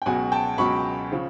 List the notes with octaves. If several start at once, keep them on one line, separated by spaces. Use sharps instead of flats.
G5
C#2 B2 F#3 F#5 G#5
G5 A5
C#2 B2 F#3 B5 C#6
C#3 F3